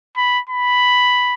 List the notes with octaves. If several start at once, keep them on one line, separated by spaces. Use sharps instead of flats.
B5
B5